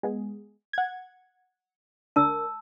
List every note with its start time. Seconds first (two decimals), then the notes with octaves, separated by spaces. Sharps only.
0.03 G#3 B3 G#4
0.73 F#5 G#6
2.16 D2 D4 A#4 A5 E6